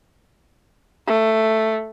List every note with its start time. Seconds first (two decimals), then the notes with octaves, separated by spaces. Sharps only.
1.07 A3